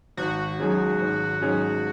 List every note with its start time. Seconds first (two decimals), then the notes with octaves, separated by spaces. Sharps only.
0.17 G#1 F#4
0.59 G#2 F#3 C#4 G#4
1.00 G#1
1.41 G#2 F#3 C#4 G#4